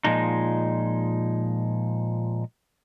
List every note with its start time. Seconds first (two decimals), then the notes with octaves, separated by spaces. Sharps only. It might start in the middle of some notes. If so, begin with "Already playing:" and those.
0.04 A#2 F3 G#3 D#4